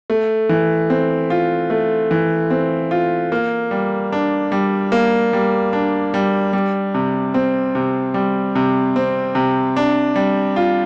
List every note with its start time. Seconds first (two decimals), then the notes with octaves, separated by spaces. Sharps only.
0.10 A3
0.49 E3
0.90 C4
1.30 F4
1.70 A3
2.11 E3
2.50 C4
2.91 F4
3.32 A#3
3.71 G3
4.12 D4
4.52 G3
4.92 A#3
5.33 G3
5.73 D4
6.14 G3
6.53 G3
6.94 C3
7.34 C4
7.75 C3
8.14 G3
8.55 C3
8.96 C4
9.35 C3
9.76 D4
10.16 G3
10.56 F4